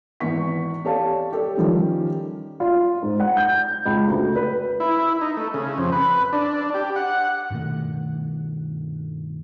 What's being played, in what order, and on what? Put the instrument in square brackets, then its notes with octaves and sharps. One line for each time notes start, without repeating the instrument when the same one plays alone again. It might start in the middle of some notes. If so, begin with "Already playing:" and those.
[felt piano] G#1 E2 E3 C#6 B6
G4 A4 C#5 D5 F5 A5
G4 A4 D5
D#3 F3 G3 C#4
[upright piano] F4
G#2
F#5
G6
C#2
D2
B4
[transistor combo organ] E4
D#4
A3
C#3
F2
B4
D4
G4
F#5
[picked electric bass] G2 B2 D#3 A3